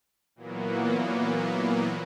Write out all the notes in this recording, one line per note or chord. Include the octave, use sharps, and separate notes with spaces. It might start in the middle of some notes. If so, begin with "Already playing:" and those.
A#2 E3 F#3 A#3 B3